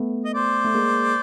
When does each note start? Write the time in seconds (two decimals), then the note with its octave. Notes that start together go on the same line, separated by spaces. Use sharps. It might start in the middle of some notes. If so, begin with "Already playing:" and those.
Already playing: A3 B3
0.25 D#5
0.34 C5 D5
0.64 A3
0.74 G#3 A#3